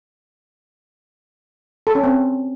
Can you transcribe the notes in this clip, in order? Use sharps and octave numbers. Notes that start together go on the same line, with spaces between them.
A4
C#4
C4